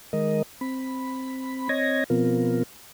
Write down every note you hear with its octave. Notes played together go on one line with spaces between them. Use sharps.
D#3 G#3 A#4 D#5
C4 B5
C4 C#5 D#5 G#6 A#6
B2 F3 B3 C4 F4 A#4